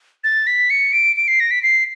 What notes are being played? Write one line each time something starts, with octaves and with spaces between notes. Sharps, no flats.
A6
B6
C#7
D7
D7
C7
A#6
B6
C7